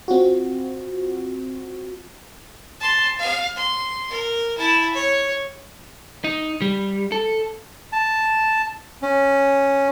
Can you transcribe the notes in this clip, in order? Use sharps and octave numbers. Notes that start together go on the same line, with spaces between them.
C4 F4 F#4
A5 C6
F5
C6
A#4
E4 A5
C#5
D#4
G3
A4
A5
C#4